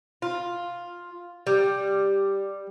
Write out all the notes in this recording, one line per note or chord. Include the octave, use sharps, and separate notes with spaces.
F4
G3